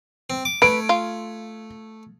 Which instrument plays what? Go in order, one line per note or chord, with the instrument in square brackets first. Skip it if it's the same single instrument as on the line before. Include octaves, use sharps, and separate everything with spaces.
[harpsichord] C4
D6
[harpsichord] A3 [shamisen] B4 [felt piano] D7
[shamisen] F4